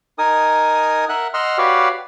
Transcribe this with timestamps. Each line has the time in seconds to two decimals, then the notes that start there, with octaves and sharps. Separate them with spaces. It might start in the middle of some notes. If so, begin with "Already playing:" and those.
0.18 D#4 A#4 G#5 D#6
1.09 A#4 E5 F#5 F#6
1.34 D#5 F#5 C6 E6 F6
1.58 F#4 G4 B4 C#5 D5 F5